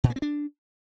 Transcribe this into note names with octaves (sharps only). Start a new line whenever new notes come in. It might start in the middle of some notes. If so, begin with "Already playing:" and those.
A#2
A#3
C4
D4